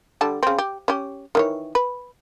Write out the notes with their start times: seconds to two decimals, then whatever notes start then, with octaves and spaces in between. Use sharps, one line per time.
0.21 D3 G3 A5
0.43 C#3 C4
0.59 G4
0.88 C#4 G4
1.35 D#3 E3 C#5
1.75 B4